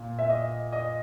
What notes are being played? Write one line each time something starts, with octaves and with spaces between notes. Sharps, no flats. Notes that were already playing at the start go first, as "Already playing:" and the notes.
Already playing: A#2
E5
D#5
D#5